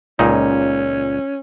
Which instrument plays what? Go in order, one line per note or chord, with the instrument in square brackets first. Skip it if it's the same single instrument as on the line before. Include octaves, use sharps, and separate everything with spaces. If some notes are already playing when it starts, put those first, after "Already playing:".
[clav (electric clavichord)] C#2 A#2 D#4 [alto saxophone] C#4